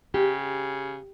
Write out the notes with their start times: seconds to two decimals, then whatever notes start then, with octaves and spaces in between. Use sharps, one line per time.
0.14 C#3 G4